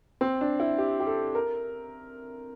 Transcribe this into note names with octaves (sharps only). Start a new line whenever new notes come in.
C4
D4
E4
G4
G4
A4
A#4